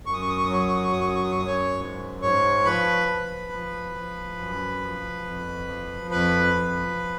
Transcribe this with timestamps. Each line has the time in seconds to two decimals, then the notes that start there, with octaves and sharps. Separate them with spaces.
0.06 F#2 C#6
0.14 D#6
0.22 C#6
0.29 D#6
0.37 C#6
0.45 D#6
0.49 F#3 C#6
0.60 D#6
0.68 C#6
0.76 D#6
0.84 C#6
0.92 F#2 D#6
1.00 C#6
1.08 D#6
1.16 C#6
1.24 D#6
1.31 C#6
1.35 F#2 D#6
1.47 C#5 C#6
1.79 G#2
2.22 G#2 C#5 C#6
2.65 F3 B4 B5
3.09 F3
3.52 F3
3.95 F3
4.38 F#2
4.81 F3
5.25 F2
5.68 F3
6.11 F2 B4 B5
6.54 F3